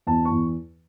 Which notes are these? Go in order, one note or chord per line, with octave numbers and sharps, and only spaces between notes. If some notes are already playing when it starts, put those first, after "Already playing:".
E2 A5
C#6
E2